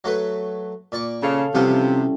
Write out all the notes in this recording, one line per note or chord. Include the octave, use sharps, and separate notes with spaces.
F#3 A3 B4
A#2 D5 C#6
C#3 A4 C#5 F5
C3 F3 G3 B3 C#4 E4 F4